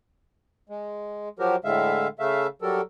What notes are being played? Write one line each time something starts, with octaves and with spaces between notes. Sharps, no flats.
G#3
F3 F#3 F#4 G4 A#4
A2 D3 G#3 E5 F5
C#3 A3 E5 F5
F#3 G3 A4 A#4